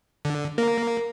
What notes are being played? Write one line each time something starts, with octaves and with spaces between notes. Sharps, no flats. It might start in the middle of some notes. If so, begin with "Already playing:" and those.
D3
A#3 A#4